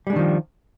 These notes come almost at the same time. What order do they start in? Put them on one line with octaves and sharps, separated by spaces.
G3 G#3 D4 D#3 F3